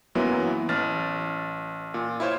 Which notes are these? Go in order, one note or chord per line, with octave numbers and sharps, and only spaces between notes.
F#2 E3 F#3 A#3 B3 E4
A1 F6 A6
A#2
E4 F4 C5 C#5